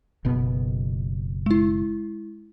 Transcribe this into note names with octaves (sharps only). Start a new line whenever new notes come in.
F#1 B2 B3
G#3 E4